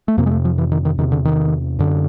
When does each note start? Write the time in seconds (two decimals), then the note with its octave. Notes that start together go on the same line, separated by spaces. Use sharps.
0.08 A3
0.17 F2 C3 A#3
0.26 G#3
0.31 A3
0.45 F3
0.58 E3
0.72 D#3
0.85 D#3
0.98 E2 C3 D#3
1.12 D3
1.25 D#3
1.79 F#2 D3